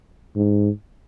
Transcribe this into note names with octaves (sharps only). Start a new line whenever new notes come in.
G#2